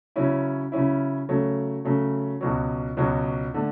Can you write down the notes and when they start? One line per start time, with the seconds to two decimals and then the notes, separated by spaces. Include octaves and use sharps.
0.16 C#3 F#3 C#4 E4
0.72 C#3 F#3 C#4 E4
1.29 C#3 F#3 A3
1.85 C#3 F#3 A3
2.41 C#2 B2 F#3
2.97 C#2 B2 F#3
3.54 D3 A3